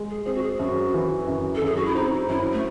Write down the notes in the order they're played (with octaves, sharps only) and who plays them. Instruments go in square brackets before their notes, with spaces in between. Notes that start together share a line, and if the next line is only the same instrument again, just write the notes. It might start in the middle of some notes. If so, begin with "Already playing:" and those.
Already playing: [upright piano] G#3
[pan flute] G#4
[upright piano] C4 [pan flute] G#4
[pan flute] F#4
G#4
[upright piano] F#2 [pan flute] F#4
[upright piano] E3
F#2
[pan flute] A4
[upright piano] F#2 [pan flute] G#4
[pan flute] F#4
E4
[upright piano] C4 [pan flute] D#4
[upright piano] F#2 [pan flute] E4
[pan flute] A3